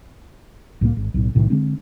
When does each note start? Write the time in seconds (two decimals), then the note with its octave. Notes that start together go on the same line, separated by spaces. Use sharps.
0.81 C2 A2 G3 A#3
0.97 G#1
1.14 B1 A2
1.35 B1 A2 C3 D#3
1.50 D3 G#3 C4 D4